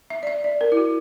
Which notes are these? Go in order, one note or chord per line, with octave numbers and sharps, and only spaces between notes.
E5
D5
E5
D5
A#4
E4
F#4